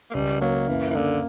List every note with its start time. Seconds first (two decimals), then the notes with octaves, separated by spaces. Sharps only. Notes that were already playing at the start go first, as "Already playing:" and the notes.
0.10 A#3
0.14 C#2 G3
0.41 F#3 A#3
0.68 F#2 E3
0.90 E3
0.95 D3 A#3